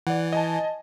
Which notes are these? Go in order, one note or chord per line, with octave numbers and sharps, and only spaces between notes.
E3 D5 F#5
D#5 G#5 A5